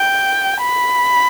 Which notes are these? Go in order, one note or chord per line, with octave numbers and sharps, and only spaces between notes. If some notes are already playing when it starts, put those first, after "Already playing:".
Already playing: G5
B5